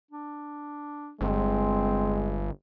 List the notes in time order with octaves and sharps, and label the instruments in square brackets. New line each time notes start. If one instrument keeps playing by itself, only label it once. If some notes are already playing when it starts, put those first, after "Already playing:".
[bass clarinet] D4
[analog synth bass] G1 [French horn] G#3 [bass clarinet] C4